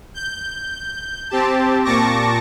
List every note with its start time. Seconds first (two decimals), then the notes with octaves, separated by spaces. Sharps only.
0.14 G6
1.30 C4 G4 A5
1.84 A#2 A5 C#6 D6 A#6